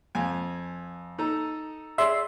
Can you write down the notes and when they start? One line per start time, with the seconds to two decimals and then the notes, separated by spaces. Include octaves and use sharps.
0.15 F2 G#5
1.18 D#4 A4 A#5
1.98 G#4 D5 E5 C6